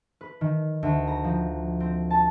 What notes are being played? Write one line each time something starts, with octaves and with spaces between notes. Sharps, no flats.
B4
D#3
D2
A#5
F3
C4
A5